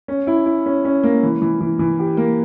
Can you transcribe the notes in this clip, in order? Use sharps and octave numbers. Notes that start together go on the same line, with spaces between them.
C#4
E4
E4
C#4
C#4
A#3
E3
E3
E3
E3
G4
A#3